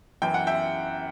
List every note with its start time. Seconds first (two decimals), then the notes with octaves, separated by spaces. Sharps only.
0.22 F#2 E3 G5
0.34 F#5
0.47 E5 G5